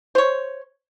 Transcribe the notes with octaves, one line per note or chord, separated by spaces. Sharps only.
C5 C#5